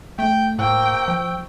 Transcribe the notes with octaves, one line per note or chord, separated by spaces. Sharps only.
A3 G5
A2 A#3 C5 G5 C#6 E6
F3